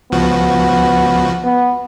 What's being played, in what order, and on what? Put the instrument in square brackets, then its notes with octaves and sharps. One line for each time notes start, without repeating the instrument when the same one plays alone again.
[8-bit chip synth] C#2 F3 F#4 [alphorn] B3
[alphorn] B3